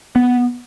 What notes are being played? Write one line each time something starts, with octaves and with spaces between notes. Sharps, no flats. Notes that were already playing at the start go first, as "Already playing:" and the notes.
B3